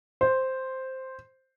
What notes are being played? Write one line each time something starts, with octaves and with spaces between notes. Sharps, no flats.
C5